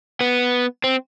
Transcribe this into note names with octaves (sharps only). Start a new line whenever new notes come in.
B3
C4